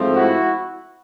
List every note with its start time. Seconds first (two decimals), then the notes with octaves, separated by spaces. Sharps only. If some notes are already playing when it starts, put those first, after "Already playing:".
Already playing: G#2 F3 A3 C4
0.16 E4 F#4